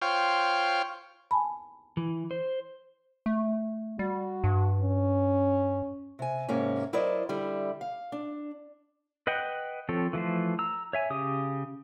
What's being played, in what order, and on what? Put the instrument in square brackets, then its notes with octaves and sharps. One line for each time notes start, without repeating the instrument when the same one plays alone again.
[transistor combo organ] F4 C5 C#5 G5 F6
[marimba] G#5 A5 B5
[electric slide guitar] E3
C5
[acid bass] A3
[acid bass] G3 [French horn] F#4
[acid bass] G2
[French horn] C#4
[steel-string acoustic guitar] C3 G#5
G#2 C3 G#3 A#3 C#4
F#3 E4 A#4 C5 D5 D#5
D3 G3 E4
F5
D4
[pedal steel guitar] B4 D#5 F#5 G5
F3 C4 A4 C#5
E3 F3 A3 C5
A#5 E6
C#5 E5 G#5
C#3 G4 D#6